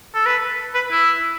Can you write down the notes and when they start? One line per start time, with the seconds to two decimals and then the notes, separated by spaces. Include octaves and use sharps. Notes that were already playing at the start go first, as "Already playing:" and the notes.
0.15 A4
0.26 B4
0.75 B4
0.91 E4